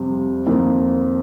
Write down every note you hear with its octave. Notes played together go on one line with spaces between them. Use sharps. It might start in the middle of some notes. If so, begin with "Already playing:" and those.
Already playing: F2 C3 G3
F2 D#3 A#3